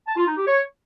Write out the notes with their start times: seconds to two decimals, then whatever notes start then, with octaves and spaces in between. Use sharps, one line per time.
0.07 A5
0.17 F4
0.27 D#4
0.37 G4
0.47 C#5